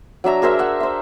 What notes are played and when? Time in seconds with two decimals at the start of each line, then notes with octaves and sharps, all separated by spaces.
0.24 F#3 D4 E5 A#5
0.42 G#4 A#4 C5 E5
0.59 E5 F#5
0.80 C5 E5